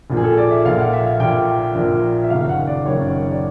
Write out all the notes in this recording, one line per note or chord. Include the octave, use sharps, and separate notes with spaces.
A#1 A#2 F3
G#4
A4
D5
E5
A#1 A#2 F3 F5
F#5
E5
F5
A#1 A#2 F3 G5
A#1 A#2 F3
E5
F#1 F#2 D#3 F5
F#5
D5
F#1 F#2 D#3 C#5
D5